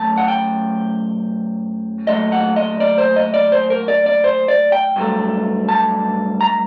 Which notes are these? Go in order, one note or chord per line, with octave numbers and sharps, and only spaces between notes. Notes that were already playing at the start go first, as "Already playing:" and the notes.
Already playing: F#2 F#3 A3 A5
F#5
G5
A#2 F#3 A3 D#5
F#5
D#5
D5
C5
D#5
D5
C5
A#4
D5
D5
C5
D5
G5
G2 F#3 A3
A5
A#5